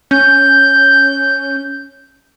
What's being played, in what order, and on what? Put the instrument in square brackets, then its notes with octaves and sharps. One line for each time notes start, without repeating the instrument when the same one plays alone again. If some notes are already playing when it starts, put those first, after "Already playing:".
[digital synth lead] C#4 [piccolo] G6